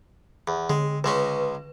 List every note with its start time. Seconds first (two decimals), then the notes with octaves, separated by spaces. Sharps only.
0.48 E2
0.70 D3 G#3
1.04 C#2 G#3 C#4 B4